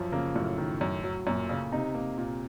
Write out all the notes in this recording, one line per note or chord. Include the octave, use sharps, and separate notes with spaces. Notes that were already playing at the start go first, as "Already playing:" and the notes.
Already playing: F#2 F3
C#3 A#3
F#2 A2
D#3
F#2
F#3
F#2 A#2
C#3
C3 D#4
A#3
A#2